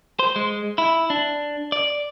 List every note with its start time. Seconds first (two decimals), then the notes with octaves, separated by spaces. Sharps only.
0.19 C5
0.36 G#3
0.78 E4
1.10 D4
1.72 D5